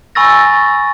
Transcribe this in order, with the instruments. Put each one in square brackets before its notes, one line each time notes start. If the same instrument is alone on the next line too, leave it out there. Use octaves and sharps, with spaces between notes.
[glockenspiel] G#5 B5 C#6 E6 A6 A#6